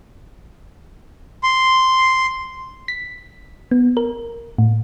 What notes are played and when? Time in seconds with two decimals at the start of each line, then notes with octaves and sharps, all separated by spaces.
1.43 C6
2.88 B6
3.71 B3
3.97 A#4
4.58 A2